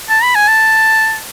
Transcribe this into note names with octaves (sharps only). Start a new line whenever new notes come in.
A5
B5
G#5
A5